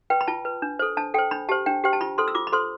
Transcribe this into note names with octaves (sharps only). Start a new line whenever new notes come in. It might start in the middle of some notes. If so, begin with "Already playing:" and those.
B4 G5
B5
F4 A5
B4
D4
A4 C5
D4 A5
A4 C5 G5
D4 B5
G4 C5 A5
D4 G5
G4 C5 G5
A5
F4 B5
A4 C5 C6
E6
F4 D6
B5
A4 C5 C6